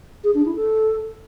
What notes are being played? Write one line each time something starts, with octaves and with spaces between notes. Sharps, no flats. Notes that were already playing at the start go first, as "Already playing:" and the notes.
G#4
D4
E4
A4